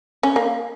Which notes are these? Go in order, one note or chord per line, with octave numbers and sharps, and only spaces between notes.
C#4
A#3